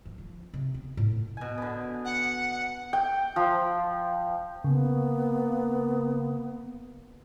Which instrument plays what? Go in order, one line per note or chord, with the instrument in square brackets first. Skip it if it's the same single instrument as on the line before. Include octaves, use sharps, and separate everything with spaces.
[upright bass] E3
F3
C3
B3
A2
[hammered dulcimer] B2 G#5
D3 B3
[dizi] F#5
[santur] G5
F3
[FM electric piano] C#3 [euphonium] A#3 [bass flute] B3